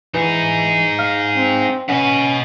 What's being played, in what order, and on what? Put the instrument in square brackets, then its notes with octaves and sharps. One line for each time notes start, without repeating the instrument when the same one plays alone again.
[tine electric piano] E3 [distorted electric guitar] D#4 G#4
[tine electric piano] F5
[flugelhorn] C4
[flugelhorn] C#4 [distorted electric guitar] B4 D#5 [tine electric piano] F#5